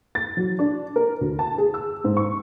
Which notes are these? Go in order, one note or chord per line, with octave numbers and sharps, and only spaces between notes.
A6
F#3
D4
A#4
D2
A5
G#4
E6
G#2
C#6